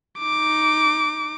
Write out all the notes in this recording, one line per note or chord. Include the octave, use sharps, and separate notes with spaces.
D#4 D6